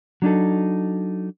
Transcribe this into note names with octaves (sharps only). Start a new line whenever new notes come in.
F#3 D4 D#4 A4